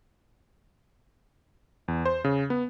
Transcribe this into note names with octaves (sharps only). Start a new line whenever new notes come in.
E2
C5
C#3
B3